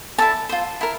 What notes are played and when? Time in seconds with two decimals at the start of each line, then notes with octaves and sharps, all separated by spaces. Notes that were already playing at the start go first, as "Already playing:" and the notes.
0.18 E4 A4 D5 A5
0.49 F4 C5
0.81 E4 A#4